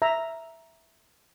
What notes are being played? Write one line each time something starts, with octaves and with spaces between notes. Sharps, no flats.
E5 A#5